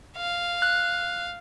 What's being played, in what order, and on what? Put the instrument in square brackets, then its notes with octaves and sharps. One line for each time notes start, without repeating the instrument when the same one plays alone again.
[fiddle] F5
[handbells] F#6